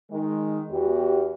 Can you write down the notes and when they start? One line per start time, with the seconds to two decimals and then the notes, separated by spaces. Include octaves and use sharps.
0.11 D#3 G#3
0.70 E2 F#4 G4